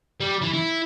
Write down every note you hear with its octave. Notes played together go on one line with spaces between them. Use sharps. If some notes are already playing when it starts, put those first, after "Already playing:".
G3
E3
E4